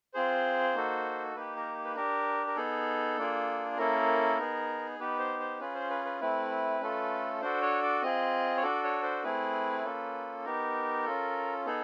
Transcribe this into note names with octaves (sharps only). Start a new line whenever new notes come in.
C4 F4 G#4 C5
A#3 D#4 F#4 A4
A#3 D#4 G4 B4
A#4
B4
D4 G4 A#4
A#4
B3 D#4 G#4 A4
A#3 D4 F4 G#4
A#3 C#4 E4 A4 A#4
B3 D#4 G#4
B3 D#4 G4 B4
C5
C5
C#4 F4 G#4 B4
C5
B4
B4
A3 C4 E4 B4
A3 C#4 F4 A4
D4 F#4 A4 C5
C#5
D5
C4 F4 G#4 D#5
C#5
D4 F#4 A4 D5
C#5
C5
A3 C4 E4 G#4 B4
A#3 C#4 F4 A4
B3 D#4 G4 A#4
C#4 F4 A4
B3 D#4 G#4 A4